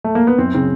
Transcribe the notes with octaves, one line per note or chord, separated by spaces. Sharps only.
A3
A#3
B3
F#2 C4
C#3 C4